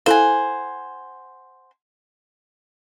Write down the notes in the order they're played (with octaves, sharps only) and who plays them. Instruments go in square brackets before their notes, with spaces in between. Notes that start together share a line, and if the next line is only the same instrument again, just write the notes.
[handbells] E4 A4 F5 [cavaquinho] C5 F#5 G#5